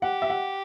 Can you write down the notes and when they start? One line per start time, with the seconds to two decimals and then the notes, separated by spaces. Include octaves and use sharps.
0.02 G4 F#5
0.22 E5
0.30 F#5